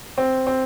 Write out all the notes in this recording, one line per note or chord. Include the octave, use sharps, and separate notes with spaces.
C4
C4